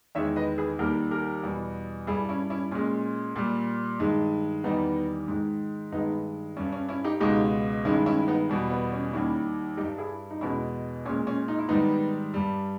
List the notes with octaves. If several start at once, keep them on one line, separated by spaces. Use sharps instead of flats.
E2 D#3 G#3 C#5 E5
B4 D#5
G#4 B4
D#2 D#3 G3 G4 A#4
G4 A#4
E2 B2 G3
G2 G3 E4 G#4
C#4 E4
C#4 E4
A#2 G#3 C#4
A#2 G3
G2 D#3 G#3
E2 D#3 G3 B3 D#4
G#2 D#3 G#3
G2 D#3 G#3 B3 D#4
G2 G3 C#4
C#4
C#4 E4
D#4 G4
C#2 B2 G#3 D#4 G4
G2 D#3 G#3 C#4 E4
C#4 E4
B3 D#4
E2 B2 G3
B3
B3
C#4
D#2 D#3 G3 C#4 E4
G3 D#4 G4
G2
E4 G#4
D#4
E2 B2 G#3 C#4 E4
A#2 G#3 C#4
C#4
D#4
E4
G#2 D#3 G3 B3 D#4
G2 G3